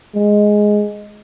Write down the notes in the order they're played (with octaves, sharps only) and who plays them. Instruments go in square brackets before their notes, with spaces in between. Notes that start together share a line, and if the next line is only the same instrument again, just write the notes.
[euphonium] G#3